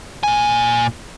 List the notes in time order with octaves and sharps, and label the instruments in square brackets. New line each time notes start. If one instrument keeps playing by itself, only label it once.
[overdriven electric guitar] A#2 G#5